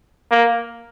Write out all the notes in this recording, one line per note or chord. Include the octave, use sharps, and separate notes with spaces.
A#3